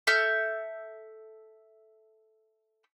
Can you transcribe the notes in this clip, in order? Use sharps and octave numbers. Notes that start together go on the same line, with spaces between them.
A4 E5 F6 G6